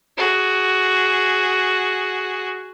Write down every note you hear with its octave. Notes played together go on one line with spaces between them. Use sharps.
F#4 G#4